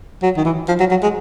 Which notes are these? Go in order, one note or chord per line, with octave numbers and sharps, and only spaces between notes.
F#3
D#3
E3
F3
F#3
F#3
G#3